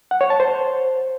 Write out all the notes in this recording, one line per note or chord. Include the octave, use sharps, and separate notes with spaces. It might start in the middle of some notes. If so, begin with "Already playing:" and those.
F#5
C#5
A5
C5